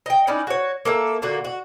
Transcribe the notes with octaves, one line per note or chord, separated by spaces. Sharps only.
D#5 G5
C#4 D#4 E4 D5
F#4 C#5
A#3 A4 E5
A#2 D3 A#3 F#4
F#4